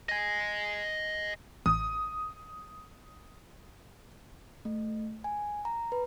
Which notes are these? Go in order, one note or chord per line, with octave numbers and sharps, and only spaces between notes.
D#5 G#5
A1 D#6
A3
G#5
A#5
B4